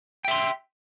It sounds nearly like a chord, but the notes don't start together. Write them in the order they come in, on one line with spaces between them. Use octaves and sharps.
G5 E5 C6